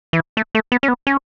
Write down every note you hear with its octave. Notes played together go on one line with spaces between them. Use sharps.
E3
A3
A3
B3
C#4
B3
C#4